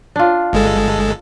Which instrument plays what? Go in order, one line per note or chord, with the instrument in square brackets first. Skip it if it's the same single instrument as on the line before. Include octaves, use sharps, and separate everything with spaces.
[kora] D4 F4
[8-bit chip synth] G1 G#3 A4